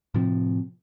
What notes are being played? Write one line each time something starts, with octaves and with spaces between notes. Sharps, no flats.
A2 C3 F3 C4